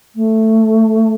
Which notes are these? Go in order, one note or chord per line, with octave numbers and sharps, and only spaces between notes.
A3